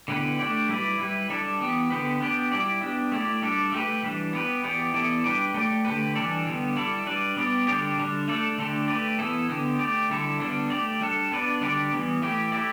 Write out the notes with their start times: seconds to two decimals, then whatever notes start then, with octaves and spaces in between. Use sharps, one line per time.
0.08 D3 B3 E4 G4 B4
0.39 A3 D4 G4 D5
0.69 G3 E4 B4 D5
0.99 G3 E4 B4
1.30 G3 D4 A4 D5
1.60 E3 B3 G4
1.91 D3 B3 G4 B4
2.20 B3 D4 G4 D5
2.52 G3 E4 G4 D5
2.82 B3 D4 G4
3.12 A3 E4 G4 D5
3.42 G3 D4 A4 D5
3.72 A3 G4 B4
4.03 E3 G3 D4
4.33 B3 G4 B4
4.64 E3 B3 G4 D5
4.94 E3 B3 E4 A4 D5
5.24 G3 D4 G4 B4 D5
5.54 A3 G4 D5
5.85 D3 A3 G4 B4
6.15 E3 G3 D4 A4 D5
6.46 D3 G3 B3
6.76 G3 E4 A4 D5
7.06 G3 D4 B4 D5
7.36 G3 B3 G4 D5
7.67 D3 G3 D4 G4 D5
7.97 D3 G3 D4
8.28 A3 D4 A4 D5
8.58 D3 A3 D4 G4
8.88 A3 G4 B4 D5
9.19 E3 B3 E4 A4
9.49 D3 B3 G4
9.79 A3 G4 D5
10.10 D3 G3 E4 A4
10.40 D3 G3 B3 D4
10.70 A3 G4 D5
11.01 G3 D4 A4
11.31 B3 D4 B4 D5
11.61 D3 G3 D4 G4 D5
11.92 E3 G3 B3
12.22 E3 A3 E4 G4
12.52 A3 E4 G4 D5